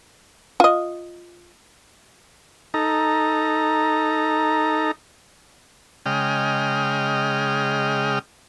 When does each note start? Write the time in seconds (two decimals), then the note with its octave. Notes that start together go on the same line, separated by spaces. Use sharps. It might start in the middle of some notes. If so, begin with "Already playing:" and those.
0.60 F4 D#5
2.74 D#4 A4 A#5
6.06 C#3 G#3 D#5 G5 F6